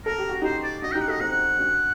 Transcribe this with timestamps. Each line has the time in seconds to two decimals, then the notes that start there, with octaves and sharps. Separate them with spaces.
0.05 A4 A#4
0.18 G4
0.29 F#4
0.42 D#4 G4 C5
0.63 D5
0.82 D4 F#4 D#5
0.92 G5
0.95 D#4 G4
1.01 F#5
1.08 F#4 A4 D#5
1.20 C4 D#4 F#5
1.59 D4 F#4